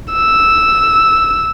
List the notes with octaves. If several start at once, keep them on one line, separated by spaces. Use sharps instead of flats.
E6